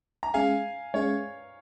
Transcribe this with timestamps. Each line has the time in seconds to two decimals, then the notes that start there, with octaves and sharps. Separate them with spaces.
0.23 A#5
0.34 G#3 C#4 G#4 F5 G#5
0.94 G#3 C#4 G#4 C#5 F5